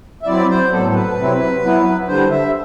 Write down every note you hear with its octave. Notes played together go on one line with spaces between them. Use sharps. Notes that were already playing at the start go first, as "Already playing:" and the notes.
E5
F#3 C4 E4 D5
C5
A2 F#3 B3 A4
A4
B4
C3 F#3 C4 E4
F#3 B3 E4
D3 G3 D4 C5
E5